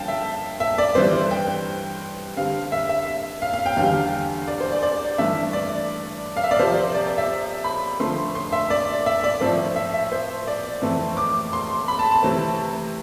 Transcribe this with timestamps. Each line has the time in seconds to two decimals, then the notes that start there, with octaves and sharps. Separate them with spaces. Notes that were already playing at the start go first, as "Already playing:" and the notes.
Already playing: G2 D3 F3 F5 G5 A5
0.08 E5
0.60 E5
0.78 D5
0.95 G2 E3 G3 B3 C5
1.31 G5
2.37 D3 G3 C4 F5
2.72 E5
2.89 E5
3.42 F5
3.53 F5
3.66 G5
3.77 E2 D3 G3 F5
4.48 D5
4.60 C5
4.72 D5
4.83 D5
5.18 G2 E3 A3 D4 E5
5.53 D5
6.37 F5
6.44 E5
6.51 D5
6.59 C3 F3 C4 C5
6.94 D5
7.07 D5
7.18 E5
7.64 B5
8.00 D3 F3 A3 C4 C6
8.35 C6
8.52 E5
8.70 D5
9.06 E5
9.24 D5
9.41 A2 F3 C4
9.76 E5
9.94 E5
10.12 C5
10.47 D5
10.82 F2 E3 A3 C4
11.17 D6
11.53 C6
11.88 B5
11.99 A5
12.11 A5
12.23 C3 E3 A3 C4